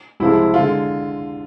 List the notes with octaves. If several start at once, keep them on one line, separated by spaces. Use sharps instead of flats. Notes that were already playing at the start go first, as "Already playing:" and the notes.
C2 C3 F3 G#3 E4
D3 G#3 F4